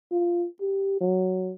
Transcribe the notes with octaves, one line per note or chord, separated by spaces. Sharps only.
F4
G4
F#3